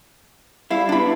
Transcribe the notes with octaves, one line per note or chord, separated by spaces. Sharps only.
G3 E4 F5
B3 D4 E4 B5